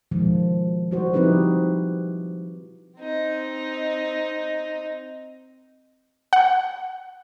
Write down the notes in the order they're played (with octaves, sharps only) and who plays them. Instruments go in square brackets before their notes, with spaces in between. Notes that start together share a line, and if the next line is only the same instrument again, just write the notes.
[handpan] B2 D#3 F3 G#3
G3 F#4 C5
F3 C4 D#4 E4 G4 B4
[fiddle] C4 D#4
[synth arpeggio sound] F#5